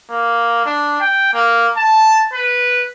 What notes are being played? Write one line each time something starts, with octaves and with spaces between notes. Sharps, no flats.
A#3
D4
G5
A#3
A5
B4